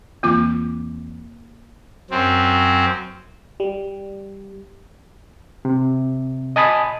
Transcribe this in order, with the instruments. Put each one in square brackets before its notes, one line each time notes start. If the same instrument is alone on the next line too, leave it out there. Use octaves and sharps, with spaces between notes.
[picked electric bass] E2 E3 C4 [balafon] A#3 F4 D6
[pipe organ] F#2 C4
[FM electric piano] G3
[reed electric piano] C3
D#5 G#5 A5 B5 D#6